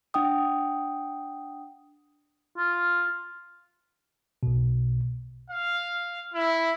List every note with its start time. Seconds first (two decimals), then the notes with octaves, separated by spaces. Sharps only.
0.14 D4 F#5 G5 D#6
2.57 F4
4.43 B1 B2
5.50 F5
6.34 E4